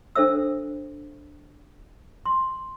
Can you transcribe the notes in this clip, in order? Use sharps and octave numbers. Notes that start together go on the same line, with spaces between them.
D4 A4 C5 E5 E6
C6